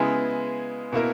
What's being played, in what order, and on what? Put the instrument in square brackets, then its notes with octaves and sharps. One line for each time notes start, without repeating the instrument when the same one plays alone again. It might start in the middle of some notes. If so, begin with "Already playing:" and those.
Already playing: [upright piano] C#3 G#3 B3 E4 G#4
B2 A#3 E4 A#4